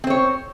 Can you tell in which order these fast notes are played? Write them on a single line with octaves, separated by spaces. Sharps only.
C4 C5 C#5